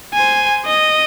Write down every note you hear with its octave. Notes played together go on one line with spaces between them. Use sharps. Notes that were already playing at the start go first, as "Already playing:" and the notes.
C5 G#5
D#5